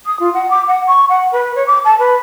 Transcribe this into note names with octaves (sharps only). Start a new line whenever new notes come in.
D#6
F4
F#5
D6
F#5
C#6
F#5
B4
C#5
D6
A5
B4